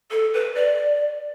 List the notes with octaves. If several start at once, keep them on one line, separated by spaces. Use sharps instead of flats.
A4
B4
D5